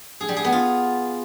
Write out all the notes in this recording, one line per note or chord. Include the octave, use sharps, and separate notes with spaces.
G#4
G3
G#4
B3
F4